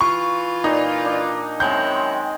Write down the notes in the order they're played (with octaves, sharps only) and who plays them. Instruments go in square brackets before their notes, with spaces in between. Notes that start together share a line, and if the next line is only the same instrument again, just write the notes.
[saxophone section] E3 F4 [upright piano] C#6
[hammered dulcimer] A#2 [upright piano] D#4
[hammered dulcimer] D4
[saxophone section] F#2 E4 C#5 [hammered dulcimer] D#3 G#3 C4 [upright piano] G6